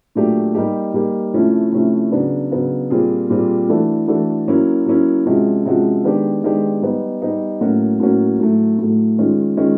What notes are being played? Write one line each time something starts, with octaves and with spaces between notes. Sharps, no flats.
A#2 F#3 A3 D4 G4
G3 A#3 D#4 G4
G3 A#3 D#4 G4
C3 F3 A3 C#4 E4
C3 F3 A3 C#4 E4
C#3 F#3 B3 D4
C#3 F#3 B3 D4
A#2 G3 C4 F4 G#4
A#2 G3 C4 F4 G#4
E3 A3 D4 F#4 A4
E3 A3 D4 F#4 A4
F#3 A#3 C#4 E4
F#3 A#3 C#4 E4
C3 F3 G#3 C#4 F#4
C3 F3 G#3 C#4 F#4
D#3 G#3 B3 D4 G4
D#3 G#3 B3 D4 G4
G3 B3 D#4
G3 B3 D#4
A2 F#3 A#3 C#4 F#4
A2 F#3 A#3 C#4 F#4
A2 F#3 A3
A2 F#3 A3
D#3 G#3 C#4 F4
D#3 G#3 C#4 F4